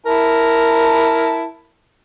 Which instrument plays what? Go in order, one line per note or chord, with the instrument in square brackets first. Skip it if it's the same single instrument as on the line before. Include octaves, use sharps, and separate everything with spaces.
[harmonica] E4 A#4 A5